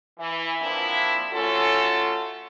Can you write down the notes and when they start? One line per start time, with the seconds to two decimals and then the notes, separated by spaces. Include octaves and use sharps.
0.19 E3
0.62 F3 A#3 C4 D4 E4
1.33 A3 C#4 F4 F#4 A4